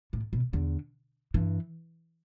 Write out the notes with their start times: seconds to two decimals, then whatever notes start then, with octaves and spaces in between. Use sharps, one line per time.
0.13 A2
0.33 B2
0.53 E2 D3
1.34 G2 E3